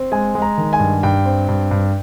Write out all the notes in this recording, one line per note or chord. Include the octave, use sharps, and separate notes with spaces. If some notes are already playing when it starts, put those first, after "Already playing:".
Already playing: C4
G#3 G#5
G#3
A#5
D#3
G#5
G2
G2 G5
C4
G2
G2